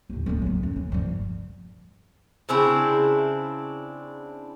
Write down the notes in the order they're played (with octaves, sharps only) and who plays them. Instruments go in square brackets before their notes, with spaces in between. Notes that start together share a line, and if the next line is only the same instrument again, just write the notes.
[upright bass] D#2 A2
G#3 B3
F#3 B3
F#2
E3
G2 F3
[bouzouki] C#3 C4 D4 E4